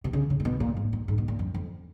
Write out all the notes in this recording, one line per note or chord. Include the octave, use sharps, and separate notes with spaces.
B2
C#3
C#3
A#2
B2
A#2
G#2
A#2
G#2
B2
A#2
F#2
F2